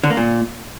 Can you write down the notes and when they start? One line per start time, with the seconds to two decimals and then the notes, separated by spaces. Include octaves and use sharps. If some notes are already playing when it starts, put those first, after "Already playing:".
0.03 D3
0.10 A#3
0.17 A#2